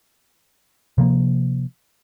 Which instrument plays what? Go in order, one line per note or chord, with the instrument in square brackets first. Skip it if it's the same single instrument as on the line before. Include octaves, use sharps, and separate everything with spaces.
[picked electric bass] C3 F3 A#3